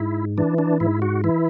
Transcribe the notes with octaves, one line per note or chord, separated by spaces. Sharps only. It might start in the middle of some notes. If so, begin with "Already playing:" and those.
Already playing: G#2 E4
E3 D4
D4
G#2 E4
F#4
E3 E4